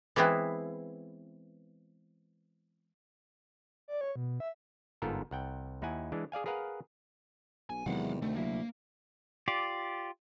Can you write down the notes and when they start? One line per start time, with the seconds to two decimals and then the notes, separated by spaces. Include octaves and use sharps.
0.16 E3 G#3 B3 C4 E4
3.88 D5
4.01 C#5
4.16 B2
4.40 E5
5.02 G1 G#2 B3 F4 A4 A#4
5.31 C2 F#5 G5
5.82 D#2 D#4 E4 F#5 G#5
6.12 E3 G#3 D4
6.32 G#4 D5 F5 G#5
6.46 G#4 A#4 B4 F5 F#5
7.70 B1 G#5
7.86 E2 C3 D#3 F#3 G#3 F5 F#5
8.22 D2 A3 C4
8.36 C2 F#3 A#3 E4
9.48 F4 G4 D5